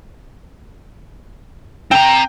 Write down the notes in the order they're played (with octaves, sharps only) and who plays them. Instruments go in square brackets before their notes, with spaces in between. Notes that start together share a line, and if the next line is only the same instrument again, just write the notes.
[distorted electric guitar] C4 A#5 [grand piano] G5